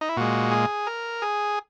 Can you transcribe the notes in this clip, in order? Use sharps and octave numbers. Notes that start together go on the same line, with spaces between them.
D#4
E4
A#2 G#3 F#4
G#4
A#4
G#4